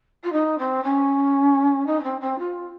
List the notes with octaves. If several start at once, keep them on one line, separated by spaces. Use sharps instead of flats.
F4
D#4
C4
C#4
D#4
C#4
C4
C4
F4